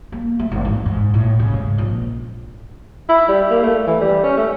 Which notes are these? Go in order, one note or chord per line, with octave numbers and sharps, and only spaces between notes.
A#3
A3
G#1
E3
G#2
A2
C#3
G#2
A#1
E4
G3
A#3
A3
E3
G3
C#4
A3